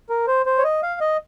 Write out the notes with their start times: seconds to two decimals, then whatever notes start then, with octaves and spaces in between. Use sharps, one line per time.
0.09 A#4
0.28 C5
0.46 C5
0.58 C#5
0.64 D#5
0.83 F5
1.01 D#5